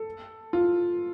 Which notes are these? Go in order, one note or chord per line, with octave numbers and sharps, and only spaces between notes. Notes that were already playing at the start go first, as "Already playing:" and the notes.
Already playing: A4
F4